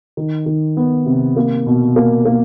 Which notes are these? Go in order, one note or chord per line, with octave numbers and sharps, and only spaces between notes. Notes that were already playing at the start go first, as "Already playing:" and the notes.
D#3
D#3
B3
C3
A#3
B2
A#3
A#3